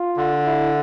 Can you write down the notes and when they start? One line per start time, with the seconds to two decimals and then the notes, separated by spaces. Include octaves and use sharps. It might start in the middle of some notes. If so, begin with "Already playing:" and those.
Already playing: F4
0.16 D3
0.45 E4